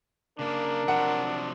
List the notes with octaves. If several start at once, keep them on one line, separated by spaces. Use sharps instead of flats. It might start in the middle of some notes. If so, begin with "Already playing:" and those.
C#3 A#3 D4 A#4
C3 F3 F#3 F#5